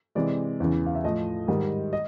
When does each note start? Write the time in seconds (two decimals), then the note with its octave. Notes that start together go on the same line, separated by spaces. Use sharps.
0.15 C3 E3 G#3 D5
0.60 E2 C#3 E3
0.86 F5
0.95 E5
1.04 A2 F3 A3 D#5
1.48 G#2 D#3 G3
1.93 D#5